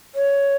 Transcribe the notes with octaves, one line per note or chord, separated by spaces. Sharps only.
C#5